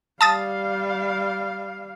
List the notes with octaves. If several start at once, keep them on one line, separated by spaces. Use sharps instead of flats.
G3 F5 A5 D#6 A6